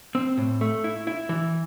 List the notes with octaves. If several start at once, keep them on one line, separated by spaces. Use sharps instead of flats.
C4
A2
A3
E4
E4
E3